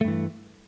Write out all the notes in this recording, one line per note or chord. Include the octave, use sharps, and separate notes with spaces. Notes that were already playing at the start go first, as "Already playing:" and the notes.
G2 E3 A3